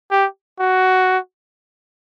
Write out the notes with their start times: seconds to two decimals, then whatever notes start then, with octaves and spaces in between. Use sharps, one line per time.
0.11 G4
0.60 F#4